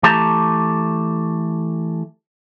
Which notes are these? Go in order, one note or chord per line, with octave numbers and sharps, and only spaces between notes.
E3 A3 G4 A4 A5 A#5